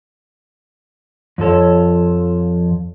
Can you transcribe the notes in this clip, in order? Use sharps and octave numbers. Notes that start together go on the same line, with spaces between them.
F2 F3 A4 C#5